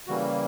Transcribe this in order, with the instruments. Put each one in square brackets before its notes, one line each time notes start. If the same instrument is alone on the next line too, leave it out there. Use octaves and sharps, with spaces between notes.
[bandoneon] C#3 E3 G3 A#3 F#4